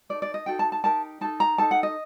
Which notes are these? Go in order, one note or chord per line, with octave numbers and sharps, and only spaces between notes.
D#4 A4 D5
D5
D#5
D#4 F#4 A4 G5
A5
A5
D#4 G4 A#4 A5
D#4 A4 A5
A#5
D#4 A4 A5
F#5
D#5